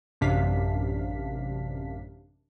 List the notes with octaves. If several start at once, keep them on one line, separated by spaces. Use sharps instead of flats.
A1 F#2 C3 D4 F5 B6